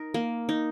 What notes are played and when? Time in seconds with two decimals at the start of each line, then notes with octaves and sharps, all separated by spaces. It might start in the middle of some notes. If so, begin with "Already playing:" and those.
Already playing: D#4 A#4
0.14 A#3
0.49 D#4